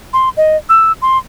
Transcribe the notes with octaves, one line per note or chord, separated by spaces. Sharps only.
C6
D#5
E6
C6